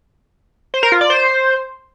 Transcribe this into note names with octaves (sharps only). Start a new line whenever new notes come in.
C5
A#4
F4
D5
C5